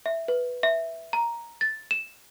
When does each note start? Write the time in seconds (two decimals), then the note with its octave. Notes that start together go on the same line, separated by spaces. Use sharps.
0.06 E5
0.28 B4
0.63 E5
1.13 A#5
1.61 A6
1.91 E7